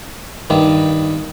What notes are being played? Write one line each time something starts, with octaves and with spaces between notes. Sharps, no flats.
G2 D#3